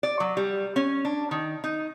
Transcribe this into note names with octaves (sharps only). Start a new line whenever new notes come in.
D5
F#3
G3
C#4
D4
D#3
D#4